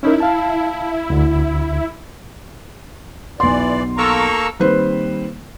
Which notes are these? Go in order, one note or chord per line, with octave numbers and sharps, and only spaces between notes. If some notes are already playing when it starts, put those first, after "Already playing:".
C#4 D#4 E4 A#4
F5 A5
D2 D3
B1 E3 D5 C6
A#3 A4 A#5 C#6
D#3 G3 A#3 C4 B4 C5